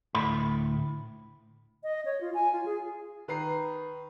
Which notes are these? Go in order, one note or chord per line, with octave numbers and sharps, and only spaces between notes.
D2 A2 B5
D#5
C#5
F4
G#5
F4
G#4
D#3 B4 A#5 C7